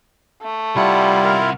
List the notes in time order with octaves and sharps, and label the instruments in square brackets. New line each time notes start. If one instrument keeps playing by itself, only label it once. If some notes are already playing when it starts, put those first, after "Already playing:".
[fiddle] A3
[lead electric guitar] C2 F#5 [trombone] G3 [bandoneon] E4 F4
[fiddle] A#4 F6